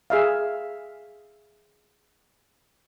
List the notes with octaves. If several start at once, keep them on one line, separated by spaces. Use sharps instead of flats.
G#4 E5 F5